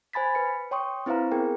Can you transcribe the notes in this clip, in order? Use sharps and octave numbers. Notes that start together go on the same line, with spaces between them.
C5 G#5 B5 A6 B6
B4 C#7
C#5 G5 C6 C#6 D#6
C4 E4 B4 C5 F5 A#5
B3 G#4 A#4 G5